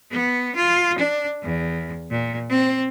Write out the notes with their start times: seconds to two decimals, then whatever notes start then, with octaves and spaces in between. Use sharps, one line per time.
0.12 B3
0.56 F4
0.99 D4
1.43 E2
2.11 A#2
2.50 C4